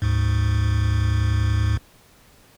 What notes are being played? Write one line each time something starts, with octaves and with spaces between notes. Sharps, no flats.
D2 G#2